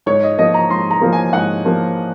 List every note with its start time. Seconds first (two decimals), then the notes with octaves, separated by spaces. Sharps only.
0.06 G#2 C#5
0.23 D#5
0.38 F3 A#3 D#5
0.54 A#5
0.70 G#2 C6
0.91 A#5
1.01 F3 A#3
1.13 G#5
1.33 G#2 F#5
1.65 F3 A#3